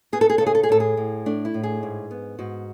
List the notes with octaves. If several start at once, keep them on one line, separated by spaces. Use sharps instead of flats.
B3 G#4
A4
G#4
C#3 A4
G#4
A4
G#4
A2 A4
G#4
A2
A3 D4
E4
A2
G#4
G#2
B3
G#2 F#4